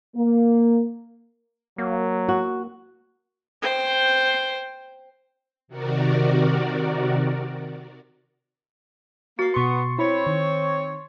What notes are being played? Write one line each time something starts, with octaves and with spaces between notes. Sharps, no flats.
A#3
F#3 A#3
F#4
C5 G5
C3 D#3 F#4 A#4 D5
A#3 F#4 A6 C7
B2 B3 C6 C#6 C#7
C4 E4 C#5 B5
D#3